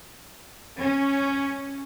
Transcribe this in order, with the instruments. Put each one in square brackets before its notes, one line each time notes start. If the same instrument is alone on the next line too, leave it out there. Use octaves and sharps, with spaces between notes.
[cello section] C#4